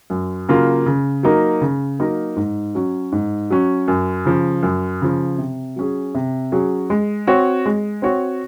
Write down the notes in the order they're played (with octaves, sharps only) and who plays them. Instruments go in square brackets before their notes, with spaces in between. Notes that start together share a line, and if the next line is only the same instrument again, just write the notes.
[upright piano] F#2
C#3 F#3 A#3 F4
C#3
F#3 A#3 D#4 A#4
C#3
F#3 A#3 D#4 A#4
G#2
F#3 C#4
G#2
F#3 C#4
F#2
C#3 F3
F#2
C#3 F3
C3
F#3 C#4 G#4
C3
F#3 C#4 G#4
G#3
C4 F#4 C#5
G#3
C4 F#4 C#5